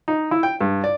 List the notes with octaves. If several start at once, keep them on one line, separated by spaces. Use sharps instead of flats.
D#4
E4
G5
G2
D5